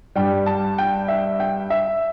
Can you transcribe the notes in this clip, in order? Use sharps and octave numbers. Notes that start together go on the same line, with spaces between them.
G2 G3 G5
A5
G5
E5
G5
E5